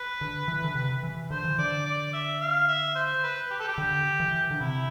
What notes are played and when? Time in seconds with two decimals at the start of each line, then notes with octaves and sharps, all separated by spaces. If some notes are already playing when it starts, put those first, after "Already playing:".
Already playing: B4
0.21 D3
0.48 E3
0.64 D3
0.75 C3
1.03 E3
1.30 D3 C5
1.44 E3
1.58 D3 D5
1.86 D5
2.13 E5
2.41 F5
2.68 E5
2.95 C5
3.23 B4
3.51 G4
3.60 A4
3.68 G4
3.78 D3
4.20 E3
4.51 D3
4.61 C3 E4